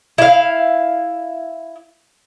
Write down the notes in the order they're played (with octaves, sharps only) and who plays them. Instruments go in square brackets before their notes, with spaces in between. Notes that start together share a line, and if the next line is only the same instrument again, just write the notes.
[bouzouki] E4 F5